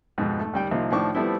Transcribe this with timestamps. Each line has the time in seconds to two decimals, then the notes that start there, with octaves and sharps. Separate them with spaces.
0.18 F2 G#2 B2
0.39 A3
0.53 D#2 G3 G5
0.71 C2 F3 A#3 D#4 F4
0.91 A2 D#3 F3 D4 C#6 D6
1.15 F3 G3 A3 B3 C4 E4